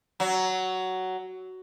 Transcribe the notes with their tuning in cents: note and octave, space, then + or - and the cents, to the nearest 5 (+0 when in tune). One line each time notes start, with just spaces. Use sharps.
F#3 +10